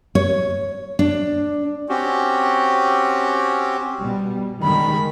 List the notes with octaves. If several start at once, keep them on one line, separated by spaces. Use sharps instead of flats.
C#5
D4
C4 C#4 F#4 G4
B2 G3
D#3 G3 G#3 B5